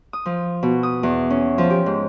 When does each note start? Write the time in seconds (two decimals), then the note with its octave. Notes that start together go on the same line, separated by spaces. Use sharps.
0.13 D#6
0.26 F3
0.63 B2
0.83 D#6
1.03 E2
1.30 C#4
1.58 F3
1.70 G4
1.86 G#2